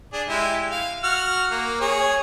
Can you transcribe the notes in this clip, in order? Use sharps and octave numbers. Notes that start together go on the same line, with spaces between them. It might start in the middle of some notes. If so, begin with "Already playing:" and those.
D4 G#4
G#3 E4 G4
F5
F#4 F6
A#3
G#4 C#5